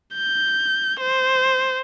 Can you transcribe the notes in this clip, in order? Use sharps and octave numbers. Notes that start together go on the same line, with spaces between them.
G6
C5